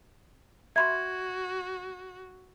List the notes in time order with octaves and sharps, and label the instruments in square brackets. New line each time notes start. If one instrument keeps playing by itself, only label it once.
[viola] F#4 [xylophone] E5 B5 C6 [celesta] G#6